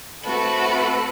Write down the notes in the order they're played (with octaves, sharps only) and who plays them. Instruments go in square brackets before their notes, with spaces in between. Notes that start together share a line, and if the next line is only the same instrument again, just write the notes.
[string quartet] A3 C4 E4 F#4 A4 B4